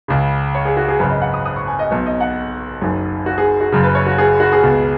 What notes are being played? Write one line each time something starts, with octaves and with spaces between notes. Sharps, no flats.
C#2 C#3
C#5
G#4
F#4
G#4
G#1 F#2 C#3 B4
D#5
F#5
D#6
D#6
C#6
G#5
D#5
B1 B2 C#5
D#5
F#5
F#1 F#2 D#3
F#4
G#4
F#4
F#1 F#2 C#3
B4
C#5
F#4
G#4
F#4
G#4
C#2 B2